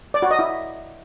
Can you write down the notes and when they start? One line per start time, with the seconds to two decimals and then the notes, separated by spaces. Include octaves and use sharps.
0.14 D5
0.22 F#4
0.31 D#5
0.39 E4